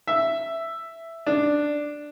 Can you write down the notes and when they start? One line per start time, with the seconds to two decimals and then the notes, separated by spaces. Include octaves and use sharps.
0.07 E5
1.27 D4